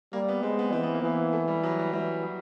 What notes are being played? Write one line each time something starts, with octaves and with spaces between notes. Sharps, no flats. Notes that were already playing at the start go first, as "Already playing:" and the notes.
G3 A#3
B3
G#3 C4
B3
E3 C4
B3
A#3
E3 B3
A3
G3
F#3
G3
E3 G3
F#3